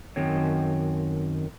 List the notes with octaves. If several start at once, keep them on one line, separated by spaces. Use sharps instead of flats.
F#2 D#3 C4 C#5